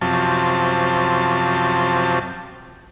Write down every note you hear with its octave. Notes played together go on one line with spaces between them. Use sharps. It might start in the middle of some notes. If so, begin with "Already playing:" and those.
F#2 C3 F3 A5